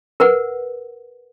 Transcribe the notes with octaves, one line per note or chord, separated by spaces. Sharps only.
A#4 B4 F#5